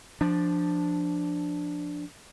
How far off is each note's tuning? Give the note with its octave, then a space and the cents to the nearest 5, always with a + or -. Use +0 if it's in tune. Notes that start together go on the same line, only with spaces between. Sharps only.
F3 +0 D4 +0